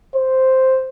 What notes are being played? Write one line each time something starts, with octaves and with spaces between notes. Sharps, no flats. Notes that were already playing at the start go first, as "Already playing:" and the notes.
C5